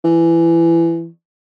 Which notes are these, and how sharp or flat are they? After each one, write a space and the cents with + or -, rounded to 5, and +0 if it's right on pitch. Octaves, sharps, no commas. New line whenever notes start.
E3 +20